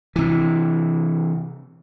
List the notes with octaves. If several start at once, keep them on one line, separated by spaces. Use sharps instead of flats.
C3 E3